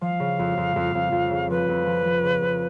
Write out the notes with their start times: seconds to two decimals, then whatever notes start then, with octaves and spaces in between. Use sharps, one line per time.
0.01 F3 F5
0.20 C#3
0.39 F2
0.58 F2
0.76 F2
0.95 F2
1.12 F2
1.31 C#3
1.50 F3 B4
1.69 F2
1.86 F3
2.05 F3
2.23 C#3
2.42 F2